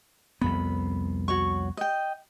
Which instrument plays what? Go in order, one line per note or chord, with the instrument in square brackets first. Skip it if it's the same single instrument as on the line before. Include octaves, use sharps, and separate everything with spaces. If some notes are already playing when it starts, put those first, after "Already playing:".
[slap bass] C2 F2 B3 [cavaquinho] B5
[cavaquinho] F#4 C#5 C#6
D#5 G5